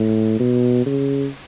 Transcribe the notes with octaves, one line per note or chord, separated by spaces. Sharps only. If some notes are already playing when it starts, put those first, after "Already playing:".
Already playing: A2
B2
C#3